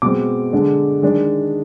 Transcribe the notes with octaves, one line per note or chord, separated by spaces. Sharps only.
B2 G#3 C4 D6
D3 G#3 D4
D#3 G#3 D4